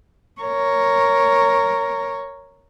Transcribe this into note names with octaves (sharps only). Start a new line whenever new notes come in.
A#4 C#5